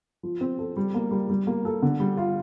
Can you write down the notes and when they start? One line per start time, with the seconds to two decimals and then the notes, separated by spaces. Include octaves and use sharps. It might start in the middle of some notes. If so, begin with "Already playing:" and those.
0.23 F3
0.41 C4
0.59 A4
0.76 G3
0.94 A#3
1.11 G3
1.30 G3
1.47 A#3
1.65 A4
1.82 D3
2.00 G3
2.17 F4